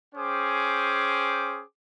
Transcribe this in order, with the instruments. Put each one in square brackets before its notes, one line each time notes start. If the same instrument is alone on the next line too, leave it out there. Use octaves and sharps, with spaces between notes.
[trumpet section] C#4 G#4 C5 G5 D6